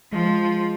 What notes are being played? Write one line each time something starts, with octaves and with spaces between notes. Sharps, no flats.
F3 G#3